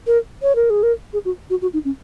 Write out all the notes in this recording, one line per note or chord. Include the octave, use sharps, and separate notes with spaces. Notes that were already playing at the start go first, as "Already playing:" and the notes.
A#4
C#5
A#4
G#4
A#4
G#4
F#4
F#4
F#4
D#4
C#4